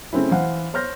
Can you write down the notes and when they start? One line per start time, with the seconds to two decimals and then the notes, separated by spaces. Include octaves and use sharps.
0.13 C#3 A3 C4 C#4 E4
0.31 E3 C5 F5 F#5
0.74 C5 C#5 C6 F6 G6 A#6